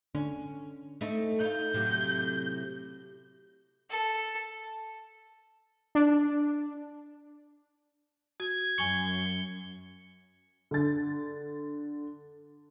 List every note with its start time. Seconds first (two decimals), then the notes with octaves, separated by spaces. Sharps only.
0.15 D3 C#4
1.01 A3 C4 D#4
1.41 D#4 F4 G6
1.74 A2 C3 F#3
3.90 A4
5.95 D4
8.40 F#4 G#6
8.78 F#2 G#5 C#6 C#7 G7
10.71 D3 A6